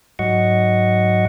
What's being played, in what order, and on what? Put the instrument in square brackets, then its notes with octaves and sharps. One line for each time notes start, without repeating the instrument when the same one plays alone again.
[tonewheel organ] G#2 F#3 D#5 F#5 C#6